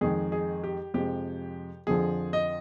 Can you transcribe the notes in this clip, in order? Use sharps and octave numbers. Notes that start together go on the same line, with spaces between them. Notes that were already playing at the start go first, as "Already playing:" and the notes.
F2 D#3 G#3 G#4
G#4
G4
F2 C3 F3 G#3 G4
F2 D3 F3 G#4
D#5